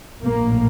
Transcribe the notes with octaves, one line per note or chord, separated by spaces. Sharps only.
A#1 A2 A#3